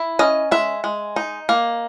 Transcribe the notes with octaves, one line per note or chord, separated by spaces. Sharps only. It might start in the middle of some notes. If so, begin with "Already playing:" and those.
Already playing: E4
C#4 D#5
G#3 E5
G#3
D#4
A#3